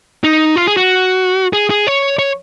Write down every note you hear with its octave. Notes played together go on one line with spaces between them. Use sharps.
D#4
F4
G#4
F#4
G#4
G#4
C#5
C#5